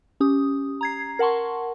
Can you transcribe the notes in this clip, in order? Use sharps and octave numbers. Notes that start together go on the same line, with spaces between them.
C#4 G4 D#6
A#5 G#6 C7
A#4 F#5 A5 C6 C#6